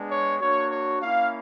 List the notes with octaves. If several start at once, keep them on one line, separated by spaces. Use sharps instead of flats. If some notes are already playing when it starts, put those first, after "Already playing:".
Already playing: G#3 B3 D4
C#5
A#3 D4 F#4 C#5
C#5
A#3 C#4 E4 F5